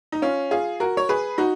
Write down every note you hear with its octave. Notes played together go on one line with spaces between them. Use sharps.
D#4
C#4 F4
F4 G#4
F#4 A#4
C#5
G#4 B4
D#4 F#4